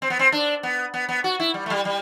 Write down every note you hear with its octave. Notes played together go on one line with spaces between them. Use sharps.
C4
B3
C4
D4
B3
B3
B3
F#4
E4
G3
A3
G3
G3